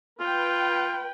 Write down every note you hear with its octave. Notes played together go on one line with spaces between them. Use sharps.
F4 B4 G5